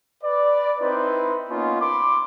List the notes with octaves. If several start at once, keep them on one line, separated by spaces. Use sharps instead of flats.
B4 D5
C4 D#4 E4 B4 C5
A#3 B3 C#4 D#4 F4
B5 C6 D6